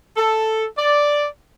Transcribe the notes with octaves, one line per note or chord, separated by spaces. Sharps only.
A4
D5